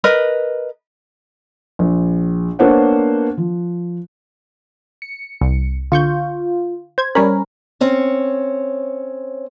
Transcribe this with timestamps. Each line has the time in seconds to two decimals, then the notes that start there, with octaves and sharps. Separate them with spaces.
0.04 A#4 B4 D#5 B5
1.79 A#1
2.59 A#3 B3 D4 C5 C#5 F#5
3.38 F3
5.02 C#7
5.41 C2
5.92 D3 F4 C#6 G6
6.98 C5 G#6
7.15 G3 C#4 A#4 C#5 B5
7.81 C4 C#4 C#5